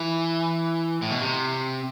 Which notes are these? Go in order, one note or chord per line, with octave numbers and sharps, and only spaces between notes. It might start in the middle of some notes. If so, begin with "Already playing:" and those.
Already playing: E3
A2
B2
C3